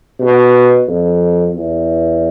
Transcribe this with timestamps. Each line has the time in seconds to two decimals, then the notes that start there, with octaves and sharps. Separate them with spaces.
0.20 B2
0.88 F2
1.55 E2